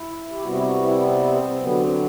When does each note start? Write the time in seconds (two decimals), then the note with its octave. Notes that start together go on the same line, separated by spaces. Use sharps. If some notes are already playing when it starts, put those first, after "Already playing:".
Already playing: E4
0.31 G4
0.42 C3 G3 B3 F#4
0.55 E4
0.63 F#4
0.82 E4
1.01 C4
1.61 D3 F#3 B3
1.82 C4